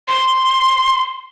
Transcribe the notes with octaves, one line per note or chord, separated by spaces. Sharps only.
C6